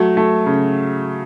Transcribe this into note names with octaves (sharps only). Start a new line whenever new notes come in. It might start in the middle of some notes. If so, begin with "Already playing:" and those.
Already playing: F#3 A3
A3
C#3